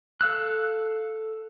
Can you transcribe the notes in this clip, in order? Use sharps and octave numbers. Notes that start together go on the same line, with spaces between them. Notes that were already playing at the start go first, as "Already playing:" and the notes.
A4 F5 E6 F#6